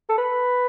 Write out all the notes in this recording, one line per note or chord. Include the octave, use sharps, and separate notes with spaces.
A4
B4